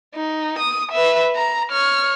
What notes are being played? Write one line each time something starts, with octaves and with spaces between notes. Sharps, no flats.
D#4
D#6
B4 E5
A#5
C#5 F6